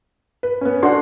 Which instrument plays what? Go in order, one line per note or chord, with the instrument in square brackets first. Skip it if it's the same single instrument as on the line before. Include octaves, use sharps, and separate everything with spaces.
[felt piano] B4
B3 C#4
[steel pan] D4 F#4 A4 [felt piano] F#5 C6